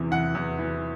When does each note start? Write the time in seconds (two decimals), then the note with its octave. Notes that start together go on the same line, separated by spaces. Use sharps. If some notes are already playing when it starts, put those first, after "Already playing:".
Already playing: E2 C3 E3
0.11 E3 F#5
0.35 E2
0.59 E3